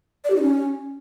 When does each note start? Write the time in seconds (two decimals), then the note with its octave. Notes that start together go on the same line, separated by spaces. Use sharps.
0.24 D5
0.30 G4
0.36 D#4
0.42 C#4